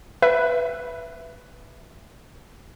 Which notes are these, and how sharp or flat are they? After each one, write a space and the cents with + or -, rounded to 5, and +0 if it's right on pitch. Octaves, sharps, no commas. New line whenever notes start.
B4 +0 E5 +15